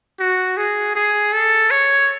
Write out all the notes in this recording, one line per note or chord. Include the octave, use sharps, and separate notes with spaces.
F#4
G#4
G#4
A4
C#5